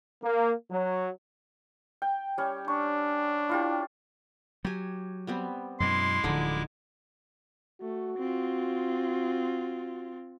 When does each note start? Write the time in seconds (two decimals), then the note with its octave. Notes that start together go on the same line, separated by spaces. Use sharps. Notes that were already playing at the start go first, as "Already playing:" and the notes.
0.22 A#3
0.71 F#3
2.02 G5
2.38 G3 C#4
2.68 D4 C#6
3.49 E4 F4 G4
4.65 F#3 G4 G#5
5.27 G3 B3 C4
5.80 F#2 B2 G#3 E4 C6 D6
6.24 D1 D3 F3 D#4 G#5
7.81 A3 F#4
8.18 C4 F4